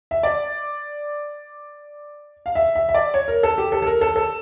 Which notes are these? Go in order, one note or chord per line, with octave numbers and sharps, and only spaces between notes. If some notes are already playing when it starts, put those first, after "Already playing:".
E5
D5
F5
E5
E5
E5
D5
C#5
A#4
A4
G4
A4
A4
A#4
A4
A4